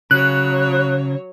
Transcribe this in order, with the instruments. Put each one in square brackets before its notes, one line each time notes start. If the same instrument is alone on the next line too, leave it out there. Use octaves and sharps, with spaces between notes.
[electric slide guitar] C#3 [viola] F#3 C#5 [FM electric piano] F#6